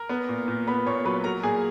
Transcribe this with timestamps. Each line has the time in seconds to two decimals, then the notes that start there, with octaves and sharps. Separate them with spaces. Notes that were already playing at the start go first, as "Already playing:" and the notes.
Already playing: A#4
0.09 B3
0.29 A#2
0.48 A#2
0.67 B3 B4 B5
0.86 A#2 C#5 C#6
1.05 F#3 B4 B5
1.24 F#3 A#4 A#5
1.43 A#2 G#4 G#5